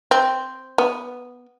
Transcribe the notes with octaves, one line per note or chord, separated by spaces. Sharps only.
C4
B3